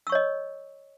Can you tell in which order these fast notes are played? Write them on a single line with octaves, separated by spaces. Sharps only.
E6 C#6 C#5 D#5